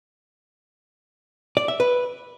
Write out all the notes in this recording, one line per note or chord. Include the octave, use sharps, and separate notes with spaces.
D5
E5
B4